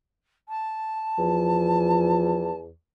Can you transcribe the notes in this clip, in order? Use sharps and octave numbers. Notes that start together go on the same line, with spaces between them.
A5
E2 F3